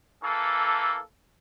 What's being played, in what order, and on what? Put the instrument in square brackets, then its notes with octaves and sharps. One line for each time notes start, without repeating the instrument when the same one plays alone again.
[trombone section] E3 A#3 A4